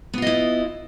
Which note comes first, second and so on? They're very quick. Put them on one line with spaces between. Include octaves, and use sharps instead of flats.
B3 F4 D#5 E4